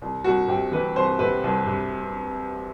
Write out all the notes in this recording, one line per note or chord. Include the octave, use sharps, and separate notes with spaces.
C2
C2 F#4
C3 G4
E3 B4
C2 C5
C3 B4
C2
C3